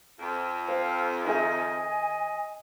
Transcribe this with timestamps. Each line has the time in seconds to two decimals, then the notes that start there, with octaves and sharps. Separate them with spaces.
0.19 F2
0.68 C5 F5
1.25 D#3 G#4 D#5 E5 G#5